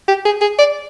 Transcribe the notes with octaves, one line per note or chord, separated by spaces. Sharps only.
G4
G#4
G#4
D5